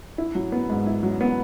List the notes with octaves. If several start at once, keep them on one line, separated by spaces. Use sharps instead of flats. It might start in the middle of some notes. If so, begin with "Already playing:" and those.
E4
F#3
B3
G#2
E4
F#3
B3